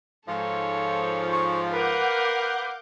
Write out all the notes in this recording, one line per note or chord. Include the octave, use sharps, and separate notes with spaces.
G#2 F3 A4 C#5
C#6
A#4 B4 F5 F#5 D6 G6